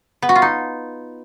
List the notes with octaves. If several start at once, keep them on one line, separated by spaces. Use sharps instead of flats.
B3
F#4
F4
D#4